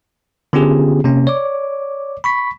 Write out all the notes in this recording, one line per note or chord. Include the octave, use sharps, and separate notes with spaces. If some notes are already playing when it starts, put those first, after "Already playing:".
D3 B3 C#4 F4 G4 G#4
C3 A#3 C#4
C#5 D5 D6
B5 C#6 B6